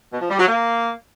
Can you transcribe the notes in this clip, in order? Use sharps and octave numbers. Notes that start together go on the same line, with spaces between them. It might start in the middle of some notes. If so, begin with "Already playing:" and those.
B2
F3
G3
F#3
A#3